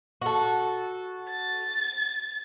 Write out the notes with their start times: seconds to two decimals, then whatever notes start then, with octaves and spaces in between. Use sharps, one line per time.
0.22 F#4 A4
1.29 A6